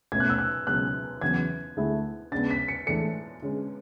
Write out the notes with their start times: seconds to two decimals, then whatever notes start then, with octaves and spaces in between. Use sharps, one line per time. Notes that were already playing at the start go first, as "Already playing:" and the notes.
0.12 B2 A3 C#4 G#6
0.20 F#6
0.30 E6
0.38 F#6
0.67 C#2 B2 F#3 C#4 F#6
1.21 E2 C#3 F#3 G#6
1.76 D2 D3 A3 E4 G#4
2.31 C#3 G#3 B3 D4 A6
2.51 B6
2.68 C#7
2.86 A2 E3 G#3 D4 A4 C#7
3.42 D3 G#3 C#4